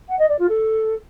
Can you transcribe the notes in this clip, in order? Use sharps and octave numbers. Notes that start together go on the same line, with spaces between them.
F#5
D#5
D5
F4
A4